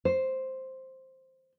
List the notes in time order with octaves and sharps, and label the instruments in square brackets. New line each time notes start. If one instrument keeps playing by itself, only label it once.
[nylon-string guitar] C5